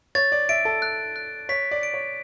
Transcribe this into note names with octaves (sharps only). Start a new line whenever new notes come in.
C#5 A6
D5
E5 D7
A4
F#6
F#6
C#5 B6
D5
D7
C#5